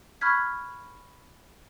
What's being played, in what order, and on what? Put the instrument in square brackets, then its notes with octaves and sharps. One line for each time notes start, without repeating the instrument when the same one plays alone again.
[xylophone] B5 C#6 F6 F#6 G#6 B6